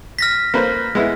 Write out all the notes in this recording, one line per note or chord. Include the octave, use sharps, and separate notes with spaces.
F6 A#6 B6
A#3 B4 C5
G#3 B3 E4